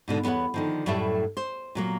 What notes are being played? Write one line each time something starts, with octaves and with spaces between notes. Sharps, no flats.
G#2 B2 D3
E2 B3 C5 C#5 F#5
D3 D#3 F3
F#2 A2 G3 A3 E4 E5
C5
A#2 F#3 A#3